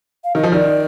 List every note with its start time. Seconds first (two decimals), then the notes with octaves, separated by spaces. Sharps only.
0.24 F5
0.35 D#3 D#5
0.43 F3
0.52 D#3 D5